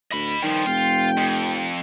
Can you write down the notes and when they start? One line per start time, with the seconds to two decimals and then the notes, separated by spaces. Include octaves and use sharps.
0.12 D2 D#5 B5
0.43 G2 D#3 F3 G5
0.66 F1 F4
1.17 F2